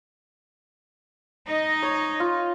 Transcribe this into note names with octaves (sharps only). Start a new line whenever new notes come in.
D#4 D#5
C#5
F4